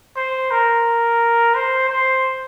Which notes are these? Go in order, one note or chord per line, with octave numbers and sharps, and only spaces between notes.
C5
A#4
C5
C5